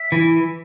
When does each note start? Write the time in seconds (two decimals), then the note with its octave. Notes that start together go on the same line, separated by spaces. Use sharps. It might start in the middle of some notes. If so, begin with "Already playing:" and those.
Already playing: E5
0.12 E3